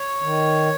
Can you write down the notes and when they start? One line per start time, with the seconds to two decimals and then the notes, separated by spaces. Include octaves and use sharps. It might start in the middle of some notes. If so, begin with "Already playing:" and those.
Already playing: C#5
0.22 D#3